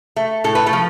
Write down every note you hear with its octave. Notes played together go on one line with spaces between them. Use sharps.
A3
A2 A4
B4
A3 A4
F3